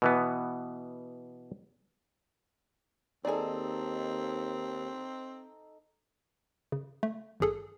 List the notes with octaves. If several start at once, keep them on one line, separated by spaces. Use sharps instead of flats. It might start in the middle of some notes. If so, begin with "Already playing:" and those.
B2 E3 B3
D#2 C4 D#4 G#4 A4 D5
C#3
A3
G#1 G2 G#4 A4